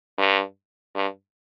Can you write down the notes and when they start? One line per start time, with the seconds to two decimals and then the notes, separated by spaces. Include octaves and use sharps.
0.18 G2
0.95 G2